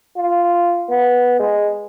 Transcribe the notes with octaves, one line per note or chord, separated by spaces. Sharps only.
F4
B3
G#3